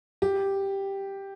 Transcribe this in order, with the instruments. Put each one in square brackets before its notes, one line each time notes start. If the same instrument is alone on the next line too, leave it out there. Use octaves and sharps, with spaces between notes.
[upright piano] G4